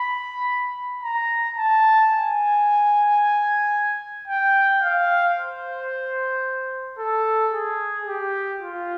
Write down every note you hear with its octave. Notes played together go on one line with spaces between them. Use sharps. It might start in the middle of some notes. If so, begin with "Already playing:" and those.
Already playing: B5
A#5
A5
G#5
G5
F5
C5
A4
G#4
G4
F4